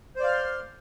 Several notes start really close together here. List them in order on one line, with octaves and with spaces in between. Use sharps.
C5 D5 F5 F6 C6